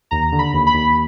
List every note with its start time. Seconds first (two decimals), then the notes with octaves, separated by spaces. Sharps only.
0.11 D#2 A#5
0.32 D3
0.39 B5
0.53 D#2
0.67 B5
0.74 D#2